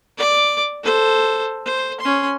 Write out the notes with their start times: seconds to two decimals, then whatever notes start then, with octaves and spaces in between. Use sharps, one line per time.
0.18 D5 D6
0.83 A4 C5
1.65 C5
2.00 C#4 C6